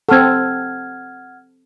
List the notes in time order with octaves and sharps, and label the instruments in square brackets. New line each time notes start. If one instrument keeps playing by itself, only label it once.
[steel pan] C4 A4 [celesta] F#5 F6 G#6